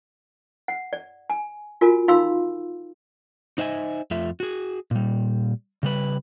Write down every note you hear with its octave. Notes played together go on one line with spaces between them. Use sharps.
F#5
D5
G#5
F4 F#4 A#4 G#5
D#4 F4 F5 B5 C6 E6
D#4 C5 D#5 E5 G#5
F2 A3 F4 E5
F#4 G#4
A#2 G3
C#3 G3 B4